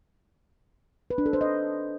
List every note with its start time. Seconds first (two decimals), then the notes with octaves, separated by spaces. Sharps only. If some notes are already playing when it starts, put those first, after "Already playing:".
1.10 B4
1.18 D4
1.26 A4
1.33 C5
1.41 D#5